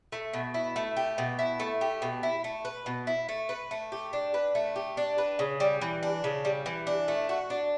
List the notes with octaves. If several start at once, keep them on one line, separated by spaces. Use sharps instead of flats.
A3
B2
E4
A3
G4
B2
E4
A3
G4
B2
E4
A3
B4
B2
E4
A3
B4
A3
G4
D4
B4
A3
G4
D4
B4
C#3
G3
E3
D4
C#3
G3
E3
D4
A3
F#4
D4